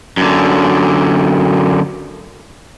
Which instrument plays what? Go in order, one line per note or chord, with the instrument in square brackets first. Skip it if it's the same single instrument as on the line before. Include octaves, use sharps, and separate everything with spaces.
[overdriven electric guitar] F#2 D3